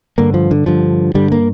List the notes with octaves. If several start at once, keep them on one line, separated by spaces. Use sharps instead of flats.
G2 D3 A#3
F3
D3
G2 D3 F3
G2 D3 G3
A#3